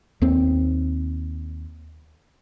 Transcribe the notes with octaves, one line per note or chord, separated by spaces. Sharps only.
D#2 C4